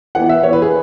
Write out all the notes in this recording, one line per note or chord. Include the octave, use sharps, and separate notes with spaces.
E3 B3 F#5
E5
E3 B3 C#5
B4
G#4